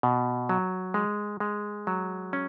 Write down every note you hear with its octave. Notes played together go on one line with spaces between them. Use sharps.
B2
F#3
G#3
G#3
F#3
C#4